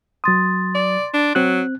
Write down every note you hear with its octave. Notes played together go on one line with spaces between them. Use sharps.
F#3 C6 D#6 A6
D5
D4
F#3 C4 F#6